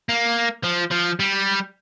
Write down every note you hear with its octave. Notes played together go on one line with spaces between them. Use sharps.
A#3
F3
F3
G3